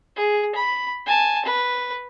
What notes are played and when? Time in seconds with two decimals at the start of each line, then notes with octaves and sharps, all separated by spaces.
0.16 G#4
0.55 B5
1.06 G#5 A5
1.45 B4